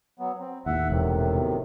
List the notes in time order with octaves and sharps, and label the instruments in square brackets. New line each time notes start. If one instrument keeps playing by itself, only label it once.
[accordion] F#3 B3
C4
[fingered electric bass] D#2 A2 [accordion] E5 F#5
[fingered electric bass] E1 [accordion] A2 C3 D#3
[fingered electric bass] B2